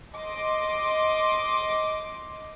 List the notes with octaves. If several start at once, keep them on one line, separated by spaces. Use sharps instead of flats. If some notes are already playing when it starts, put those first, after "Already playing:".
D#5 C6 D6